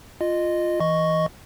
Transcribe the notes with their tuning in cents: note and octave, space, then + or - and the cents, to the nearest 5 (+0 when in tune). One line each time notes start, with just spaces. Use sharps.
F4 +0 D#5 -15
E3 +0 D#5 +0 C#6 +0